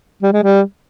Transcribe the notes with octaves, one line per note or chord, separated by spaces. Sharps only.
G3
G#3
G3